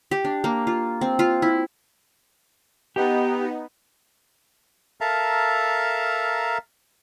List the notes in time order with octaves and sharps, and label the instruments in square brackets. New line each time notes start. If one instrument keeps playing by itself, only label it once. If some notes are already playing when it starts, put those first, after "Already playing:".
[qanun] G4
D4
A#3
F4
C4
F4
E4
[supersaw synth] B3 D#4 [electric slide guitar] G4
[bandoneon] A4 A#4 E5 F5 A5 A#5